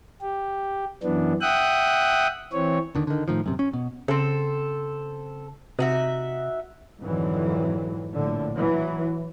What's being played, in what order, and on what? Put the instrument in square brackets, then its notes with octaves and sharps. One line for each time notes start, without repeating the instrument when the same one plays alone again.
[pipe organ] G4
F#2 E3 B3 D4
E5 F#5 G5 D#6 F#6
E3 C4 C#5
[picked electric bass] D#2 D3 D#3
D3 D#3
A2 D#3 F3
D#1 F#2 C3
C#4
B2
[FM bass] C#3 [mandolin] C4 A4
[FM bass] C3 [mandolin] D#4 F#4 E5
[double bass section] F2 G#2 D3 E3 F#3
A#1 A2 D3
E3 F#3